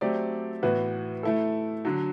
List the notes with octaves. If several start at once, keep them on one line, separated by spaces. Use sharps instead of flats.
F#3 A3 C4 G4 D5
A2 E3 B3 F#4 B4
A3 E4 A4
D3 F#3